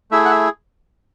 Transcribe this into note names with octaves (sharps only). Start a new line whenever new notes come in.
A3 E4 G#4 E5
F#5
E5